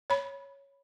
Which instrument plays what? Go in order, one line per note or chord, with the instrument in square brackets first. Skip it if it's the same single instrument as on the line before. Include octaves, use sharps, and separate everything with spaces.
[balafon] C#5 B5